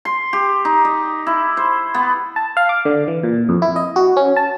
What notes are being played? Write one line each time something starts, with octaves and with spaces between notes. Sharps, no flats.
C6
G4
D#4
D#5
E4
C5
B3
A5
F5
D6
D3
E3
A#2
F2
E4
D#5
F#4
C#4
A5